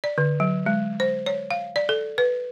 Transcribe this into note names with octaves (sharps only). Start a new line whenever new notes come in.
D5
D3
F#3
G#3
C5
C#5
F5
D5
A4
B4